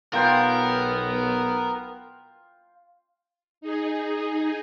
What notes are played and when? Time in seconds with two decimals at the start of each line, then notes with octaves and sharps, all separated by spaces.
0.13 B1 B3 F4 A#4 G5 C6
3.61 D#4 G#4